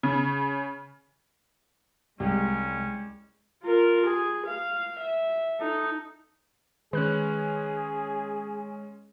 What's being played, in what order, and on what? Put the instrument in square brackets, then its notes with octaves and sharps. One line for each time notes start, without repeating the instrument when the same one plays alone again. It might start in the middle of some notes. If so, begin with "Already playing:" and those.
[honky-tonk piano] C#3
[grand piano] C2 [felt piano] G3 [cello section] G#3 [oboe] C#4
[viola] F4 A#4
G#4
F5
E5
D#4 A4
[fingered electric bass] D#3 [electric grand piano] G#3 C#4 [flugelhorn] G#4 [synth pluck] B4 F#6